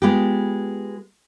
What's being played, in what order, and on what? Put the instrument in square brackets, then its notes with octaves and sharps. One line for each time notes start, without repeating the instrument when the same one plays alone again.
[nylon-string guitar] G#3 B3 F4 G4